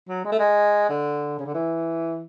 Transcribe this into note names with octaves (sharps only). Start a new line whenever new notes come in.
F#3
G#3
A3
G#3
D3
C#3
D3
E3